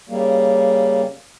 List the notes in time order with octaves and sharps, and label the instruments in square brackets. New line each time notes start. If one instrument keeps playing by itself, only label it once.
[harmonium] C#3 G3 A#3